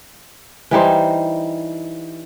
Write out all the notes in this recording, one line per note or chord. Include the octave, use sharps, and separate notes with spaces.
E3 G3 D#4 C5